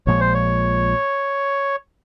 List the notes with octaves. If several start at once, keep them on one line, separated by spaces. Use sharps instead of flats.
A#1 A#2 F3 G#3 C#5
C5
C#5